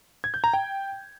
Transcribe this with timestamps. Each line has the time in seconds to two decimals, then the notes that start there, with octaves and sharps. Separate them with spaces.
0.24 G#6
0.34 G6
0.44 A#5
0.54 G5